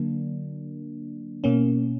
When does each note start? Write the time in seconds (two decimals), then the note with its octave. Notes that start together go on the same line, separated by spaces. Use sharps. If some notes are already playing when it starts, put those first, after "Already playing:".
Already playing: D3 F#3 A#3 D4
1.44 B2 A#3 C#4